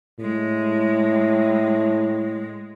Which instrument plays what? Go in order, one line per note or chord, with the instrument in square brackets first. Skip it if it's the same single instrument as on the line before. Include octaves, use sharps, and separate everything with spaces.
[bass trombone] A2 [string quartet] G#3